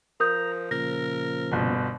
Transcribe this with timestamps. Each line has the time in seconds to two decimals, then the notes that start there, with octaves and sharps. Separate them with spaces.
0.20 F3 A#4 A#5 D#6 G6
0.71 A#2 C#3 F3 A#4 A#6
1.52 G1 B2